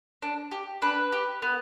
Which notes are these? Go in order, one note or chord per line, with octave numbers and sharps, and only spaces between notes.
D4
G4
D4 B4
G4
B3